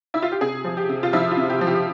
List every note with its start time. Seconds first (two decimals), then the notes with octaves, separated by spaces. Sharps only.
0.14 E4
0.22 F4
0.32 G4
0.41 C3 G#4
0.65 F3
0.77 G4
0.89 C3
1.03 F4
1.13 F3 E4
1.31 F4
1.37 C3
1.50 G4
1.61 F3
1.67 G4